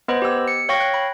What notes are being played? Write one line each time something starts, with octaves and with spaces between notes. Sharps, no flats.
B3 B4 C5 D#5 B5
G4 E6
C#7
C#5 F5 G5 C#6 G#6 A#6
F#6
B5